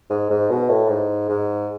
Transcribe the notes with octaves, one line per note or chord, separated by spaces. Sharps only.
G#2
G#2
B2
A2
G#2
G#2